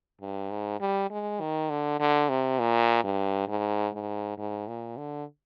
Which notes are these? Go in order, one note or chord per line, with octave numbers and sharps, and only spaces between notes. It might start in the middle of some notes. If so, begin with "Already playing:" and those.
G2
G#2
G3
G#3
D#3
D3
D3
C3
A#2
G2
G#2
G#2
G#2
A#2
D3